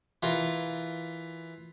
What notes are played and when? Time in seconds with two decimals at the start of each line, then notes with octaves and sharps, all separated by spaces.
0.23 E3 F4 A#4